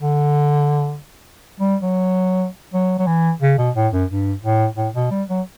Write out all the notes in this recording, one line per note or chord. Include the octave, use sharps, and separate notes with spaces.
D3
G3
F#3
F#3
F#3
E3
C#3
B2
A2
F#2
G2
A2
A2
B2
G3
F#3